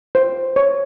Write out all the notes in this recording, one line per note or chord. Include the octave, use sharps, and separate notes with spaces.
C5
C#5